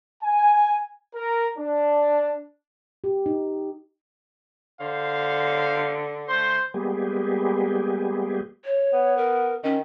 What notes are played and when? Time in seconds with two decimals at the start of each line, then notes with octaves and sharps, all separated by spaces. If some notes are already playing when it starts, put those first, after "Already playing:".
0.24 G#5
1.15 A#4
1.57 D4
3.04 G4
3.26 D#4
4.80 D3 C5 F5
6.29 A3 C5 C6
6.74 G3 G#3 A#3 B3 G4 G#4
8.65 C#5
8.93 B3
9.17 A#4
9.64 D#3 C#4